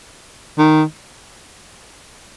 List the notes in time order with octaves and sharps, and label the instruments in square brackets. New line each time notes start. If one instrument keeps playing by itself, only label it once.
[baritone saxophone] D#3